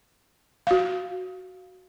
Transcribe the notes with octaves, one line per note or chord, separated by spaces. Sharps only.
F#4 F5